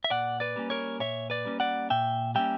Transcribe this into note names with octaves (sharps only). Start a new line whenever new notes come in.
E5
A#2 D5 F#5
B4 D5
G3 A#3 C#4
A#4 C#5
A#2 C#5 E5
B4 D5
G3 A#3 C#4
D5 F#5
A#2 E5 G5
G3 A#3 C#4 E5 G5